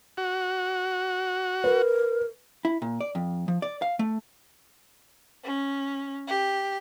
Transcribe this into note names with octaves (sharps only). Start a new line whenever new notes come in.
F#4
A#4 B4
E4
A#2
D5
F2
F3
D5
F5
A3
C#4
G4